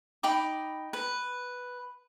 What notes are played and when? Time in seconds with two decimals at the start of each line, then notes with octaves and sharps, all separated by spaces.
0.23 D#4 G5 B5 D6
0.93 B4